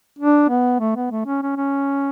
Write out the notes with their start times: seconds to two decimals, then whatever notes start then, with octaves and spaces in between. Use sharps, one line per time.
0.19 D4
0.49 B3
0.80 A3
0.96 B3
1.11 A3
1.26 C#4
1.42 C#4
1.57 C#4